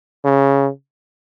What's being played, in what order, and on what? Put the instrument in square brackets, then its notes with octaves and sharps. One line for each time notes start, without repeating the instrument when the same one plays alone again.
[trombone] C#3